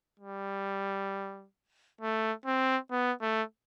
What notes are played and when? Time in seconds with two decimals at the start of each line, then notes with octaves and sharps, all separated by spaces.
0.20 G3
2.01 A3
2.46 C4
2.91 B3
3.22 A3